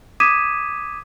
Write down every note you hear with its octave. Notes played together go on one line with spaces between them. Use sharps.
D6 D#6 G#6 B6 D#7 E7